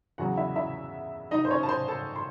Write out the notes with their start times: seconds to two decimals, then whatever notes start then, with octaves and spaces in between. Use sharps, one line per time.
0.18 E2 C#3 F#3 F#4 F#5
0.37 E4 E5
0.56 E4 E5
1.31 D#4 D#5
1.45 C5
1.50 C#4 C#5
1.63 A5
1.69 C5 C6
1.88 A4 A5
2.16 C6